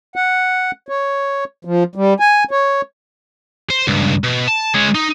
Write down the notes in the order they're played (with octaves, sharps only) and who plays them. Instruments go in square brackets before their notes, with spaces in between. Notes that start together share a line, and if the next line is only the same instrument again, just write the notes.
[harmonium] F#5
C#5
F3
G3
G#5
C#5
[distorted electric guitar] C5
C#2 G2
B2
A5
G#3 C#5
D#4